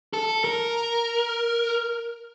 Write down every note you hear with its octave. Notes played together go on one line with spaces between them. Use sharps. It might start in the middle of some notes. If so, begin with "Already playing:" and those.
A4
A#4